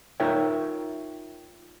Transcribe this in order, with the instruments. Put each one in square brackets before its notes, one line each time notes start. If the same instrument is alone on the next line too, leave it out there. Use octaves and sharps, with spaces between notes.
[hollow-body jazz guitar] D#4 F4 A#4 C#5 E5 G5